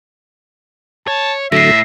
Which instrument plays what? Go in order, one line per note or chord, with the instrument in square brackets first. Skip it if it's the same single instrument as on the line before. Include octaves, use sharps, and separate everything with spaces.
[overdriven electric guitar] C#5 [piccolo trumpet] A5
[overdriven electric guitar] A2 [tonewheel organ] D3 F#3 A3 [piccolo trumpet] E5 [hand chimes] A#6 C7